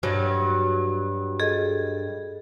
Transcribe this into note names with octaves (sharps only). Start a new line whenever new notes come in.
G2 F#3
G#4 A4 D#5